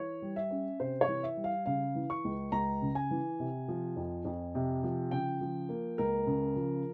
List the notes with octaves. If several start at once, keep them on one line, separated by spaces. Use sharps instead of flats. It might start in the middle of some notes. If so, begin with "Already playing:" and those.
Already playing: E3 C#5
G3
E5
C#4
C3 C5
C#5
E3
E5
G3
F5
C#3 F5
E3
C#6
C#2
C#2 A#5
C#3
G#5
E3
C3
F3
F2
F2
C3
F3
C#3 G5
F3
A#3
C#2 A#4
C#3
F3